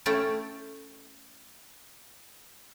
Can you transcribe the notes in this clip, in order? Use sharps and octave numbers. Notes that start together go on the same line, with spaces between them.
A3 C#4 E4 A4 G5